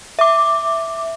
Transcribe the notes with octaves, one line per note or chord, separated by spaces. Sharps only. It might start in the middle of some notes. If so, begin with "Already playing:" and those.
E5 D6